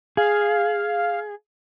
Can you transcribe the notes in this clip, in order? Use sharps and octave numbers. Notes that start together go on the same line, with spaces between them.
G#4 F5